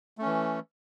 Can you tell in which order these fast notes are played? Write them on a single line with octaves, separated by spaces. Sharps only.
A3 C#4 E3